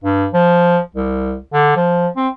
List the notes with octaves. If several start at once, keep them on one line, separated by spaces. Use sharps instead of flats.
G2
F3
C2
D3
F3
C4